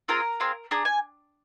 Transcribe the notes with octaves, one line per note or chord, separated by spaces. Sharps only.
C4 F4 G#4 A#4 A#5
C4 F4 G#4
D4 G#4 A#5
G#5